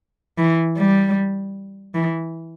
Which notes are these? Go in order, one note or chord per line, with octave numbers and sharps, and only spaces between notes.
E3
G3
E3